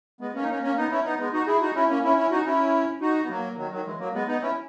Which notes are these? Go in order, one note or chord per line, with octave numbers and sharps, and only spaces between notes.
G#3 B3
A#3 C#4
D#4
A#3 C#4
A#3 C#4
B3 D#4
C#4 E4
B3 D#4
G#3 B3
D#4 F#4
E4 G#4
D#4 F#4
C#4 E4
A#3 C#4
C#4 E4
C#4 E4
D#4 F#4
C#4 E4
D#4 F#4
B3
F#3 A#3
D#3 F#3
D#3 F#3
E3 G#3
F#3 A#3
G#3 B3
B3 D#4
C#4 E4